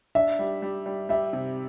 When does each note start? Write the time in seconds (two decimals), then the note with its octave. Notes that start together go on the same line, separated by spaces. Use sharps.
0.15 D4 E5
0.39 G3
0.62 G3
0.86 G3
1.09 G3 E5
1.33 C3